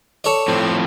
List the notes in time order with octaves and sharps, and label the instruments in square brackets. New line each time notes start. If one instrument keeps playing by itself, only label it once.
[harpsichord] A4 C#5 D5
[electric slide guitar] A2 F3 C4